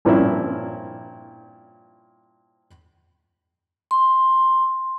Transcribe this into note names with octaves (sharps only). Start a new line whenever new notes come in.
G2 A#2 F3 C4 C#4 E4
C6